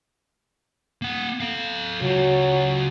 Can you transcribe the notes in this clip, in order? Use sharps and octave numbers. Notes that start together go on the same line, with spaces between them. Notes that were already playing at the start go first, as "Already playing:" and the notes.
A#3 F#5
A4 F5
C#3 F#3 F4